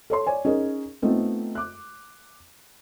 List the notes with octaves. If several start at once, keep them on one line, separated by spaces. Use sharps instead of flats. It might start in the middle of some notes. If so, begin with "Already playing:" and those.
A4 C#5 C6
C#5 D5 G#5
C#4 D#4 G#4 A#4
A3 B3 C4 D#4 F4
D6 F#6